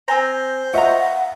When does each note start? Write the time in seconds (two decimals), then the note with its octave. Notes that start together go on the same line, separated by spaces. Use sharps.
0.08 C4 C5 G#5 A#5
0.74 F4 D#5 E5 F#5 A#5 C#6